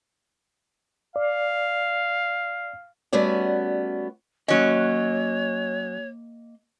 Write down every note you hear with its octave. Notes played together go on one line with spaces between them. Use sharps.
D5 F5
G3 A3 B3 C#4 F#4 D5
F#3 A#3 C#4 C#5 D#5